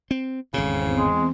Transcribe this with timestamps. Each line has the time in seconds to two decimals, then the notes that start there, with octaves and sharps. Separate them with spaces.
0.11 C4
0.54 G#1 E2 A2 C#3 C4
0.98 G#3